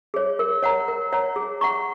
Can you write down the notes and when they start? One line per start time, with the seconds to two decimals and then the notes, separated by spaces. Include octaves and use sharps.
0.14 G#4 C#5
0.39 A#4
0.63 C#5 F#5 A#5
0.88 A#4
1.12 C#5 F#5 A#5
1.36 G#4
1.61 F#5 A#5 C#6